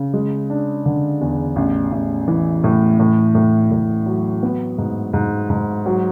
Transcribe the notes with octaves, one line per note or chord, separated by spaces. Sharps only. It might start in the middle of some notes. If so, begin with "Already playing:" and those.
Already playing: C#3
G#3
D4
D3
E2
A1
A1
E3
A2
A2
A2
A2
F#3
B3
G#2
G#2
G#2
F#3